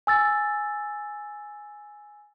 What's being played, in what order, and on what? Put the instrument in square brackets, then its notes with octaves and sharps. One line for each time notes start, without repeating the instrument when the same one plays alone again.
[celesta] G#5 E6 A6